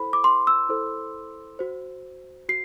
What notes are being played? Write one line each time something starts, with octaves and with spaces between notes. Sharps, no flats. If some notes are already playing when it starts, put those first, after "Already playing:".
Already playing: E4 A4 C5 B5
D6
C6
E6
E4 A4 C5
F#4 C5
F#4 C7